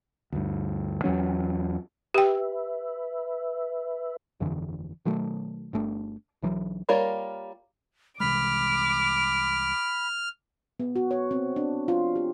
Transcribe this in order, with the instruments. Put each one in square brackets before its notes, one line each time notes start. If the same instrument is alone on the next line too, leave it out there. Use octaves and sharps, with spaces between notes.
[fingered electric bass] D2 G2
E2 E3 F#3 C#4
[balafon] G4 G5 [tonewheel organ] B4 E5
[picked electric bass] G1 F2 D3 E3
B2 D#3 F#3 A3
G1 A3 D4
B1 E3 F#3
[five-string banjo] G3 A#3 F4 A#4 C#5
[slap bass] C2 E3 G#3 [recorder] B5 [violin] D6 [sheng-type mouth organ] F6
[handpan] B3
F#4
C#5
C4
D4
F4
G4